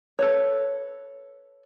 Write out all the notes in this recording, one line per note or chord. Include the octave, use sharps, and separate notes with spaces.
A4 B4 C#5